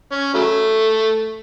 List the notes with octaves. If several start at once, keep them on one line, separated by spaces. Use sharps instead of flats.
C#4
C#3 F#3 A3